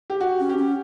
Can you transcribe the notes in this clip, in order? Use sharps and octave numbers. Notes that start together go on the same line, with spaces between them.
G4
F#4
C#4
G4
C#4